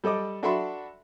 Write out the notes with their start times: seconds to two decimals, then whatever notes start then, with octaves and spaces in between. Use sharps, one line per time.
0.04 G3 A4 D#5 D6
0.43 D4 F#4 A4 E5 B5 C6